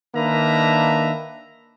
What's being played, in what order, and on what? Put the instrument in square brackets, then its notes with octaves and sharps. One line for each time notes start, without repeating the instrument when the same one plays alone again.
[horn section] D#3 A#3 D4 B4 E5 A#5